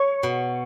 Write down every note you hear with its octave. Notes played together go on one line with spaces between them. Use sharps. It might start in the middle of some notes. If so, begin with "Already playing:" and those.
Already playing: C#5
B2